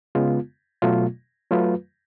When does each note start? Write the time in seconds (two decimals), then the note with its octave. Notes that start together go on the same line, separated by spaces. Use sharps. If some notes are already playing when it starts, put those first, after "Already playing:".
0.15 C#3 G#3 B3 F4
0.82 B2 F#3 A3 F4
1.51 F#3 A3 F4 B4